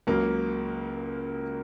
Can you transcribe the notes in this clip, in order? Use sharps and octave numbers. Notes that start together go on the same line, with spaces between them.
C#2 C#3 F#3 A#3